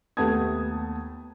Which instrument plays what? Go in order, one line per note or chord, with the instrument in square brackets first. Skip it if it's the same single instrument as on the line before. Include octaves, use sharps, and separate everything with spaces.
[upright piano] D#2 A3 B3 A5 D#6 G#6